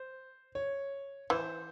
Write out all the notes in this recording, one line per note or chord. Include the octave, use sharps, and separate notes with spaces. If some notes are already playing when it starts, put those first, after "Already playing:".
Already playing: C5
C#5
E3 C5